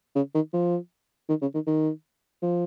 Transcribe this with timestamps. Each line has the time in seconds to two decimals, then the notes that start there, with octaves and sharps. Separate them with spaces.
0.15 C#3
0.34 D#3
0.53 F3
1.29 D#3
1.42 C#3
1.54 D#3
1.67 D#3
2.42 F3